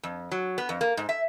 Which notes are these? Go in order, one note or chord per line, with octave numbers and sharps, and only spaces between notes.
F2
F#3
B3
F2
A#3
G#2
E5